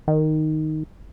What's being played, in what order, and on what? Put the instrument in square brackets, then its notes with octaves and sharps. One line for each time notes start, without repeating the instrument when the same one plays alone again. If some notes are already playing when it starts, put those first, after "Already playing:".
[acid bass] D#3